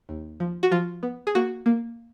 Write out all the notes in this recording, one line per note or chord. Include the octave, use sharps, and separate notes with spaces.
D#2
F3
F#4
F3 F4
B3
G#4
A#3 F#4
A#3